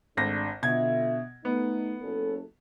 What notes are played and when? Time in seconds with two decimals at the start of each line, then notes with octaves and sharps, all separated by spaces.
0.17 G#1 G#3 A3 D4 A#6
0.63 B2 D3 F4 E5 G#6
1.45 A3 B3 D#4
2.02 F#1 C#4 A4